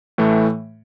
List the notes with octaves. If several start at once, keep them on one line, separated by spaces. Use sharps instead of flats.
A2 E3 A3